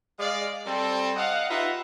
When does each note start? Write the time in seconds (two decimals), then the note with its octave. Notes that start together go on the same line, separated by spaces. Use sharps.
0.19 G#3 D5 F5
0.66 G3 C4 A4
1.17 D#5 F5 F#5
1.49 D#4 F4 G4 B4 E5 F#5